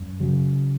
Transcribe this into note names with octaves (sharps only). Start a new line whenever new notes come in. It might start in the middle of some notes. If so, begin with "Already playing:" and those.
Already playing: F#2
C#3 F#3